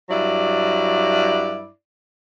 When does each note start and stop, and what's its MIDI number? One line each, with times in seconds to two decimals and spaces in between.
0.10 1.68 43
0.10 1.68 54
0.10 1.68 64
0.10 1.68 74